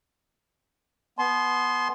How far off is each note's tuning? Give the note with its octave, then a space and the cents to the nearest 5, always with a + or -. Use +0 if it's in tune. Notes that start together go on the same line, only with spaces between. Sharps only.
B3 +0 A5 -45 C6 +0